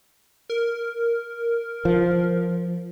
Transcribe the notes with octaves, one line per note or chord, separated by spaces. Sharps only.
A#4
F3